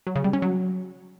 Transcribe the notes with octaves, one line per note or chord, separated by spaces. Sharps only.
F#3
C#3
G3
C#4
F#3